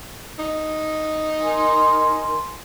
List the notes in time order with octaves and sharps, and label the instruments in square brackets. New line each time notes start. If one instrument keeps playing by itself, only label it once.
[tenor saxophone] D#4
[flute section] A#4 G#5 C6